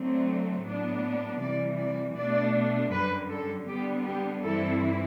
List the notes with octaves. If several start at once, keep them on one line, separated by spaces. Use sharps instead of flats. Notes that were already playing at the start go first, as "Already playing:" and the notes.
Already playing: D3 F#3 A3 C4
A2 F#3 B3 D4
C3 E3 G3 D5
D5
B2 A3 D4 D5
F#2 D3 G3 B4
A4
D3 G3 B3 D4 G4
G4
G2 E3 G3 C4 E4 A4